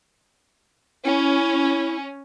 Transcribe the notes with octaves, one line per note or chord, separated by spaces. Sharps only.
C#4 E4